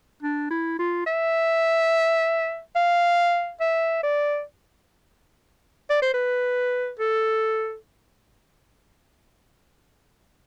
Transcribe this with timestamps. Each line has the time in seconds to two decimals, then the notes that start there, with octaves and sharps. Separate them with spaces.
0.23 D4
0.50 E4
0.79 F4
1.06 E5
2.76 F5
3.61 E5
4.03 D5
5.90 D5
6.02 C5
6.14 B4
6.99 A4